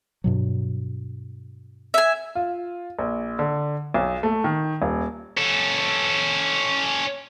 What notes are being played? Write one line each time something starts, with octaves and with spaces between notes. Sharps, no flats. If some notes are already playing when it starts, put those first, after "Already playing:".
G2 B2 F#3
E5 G#5
F4
A#1
D3
B1
A3
D#3
D#1
C#4 A4